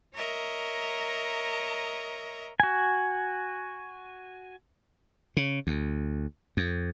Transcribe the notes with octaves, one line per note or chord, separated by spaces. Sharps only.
A#4 C#5 D#5 E5 A#5
F#4 G#5
C#3
D2
F2